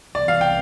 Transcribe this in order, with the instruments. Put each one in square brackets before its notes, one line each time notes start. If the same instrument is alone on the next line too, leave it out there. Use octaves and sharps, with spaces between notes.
[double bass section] C2 C3 E3 B3 [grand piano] D5
[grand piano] F5
G5